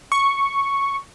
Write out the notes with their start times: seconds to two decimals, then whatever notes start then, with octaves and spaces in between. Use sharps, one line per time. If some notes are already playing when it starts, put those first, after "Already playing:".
0.12 C#6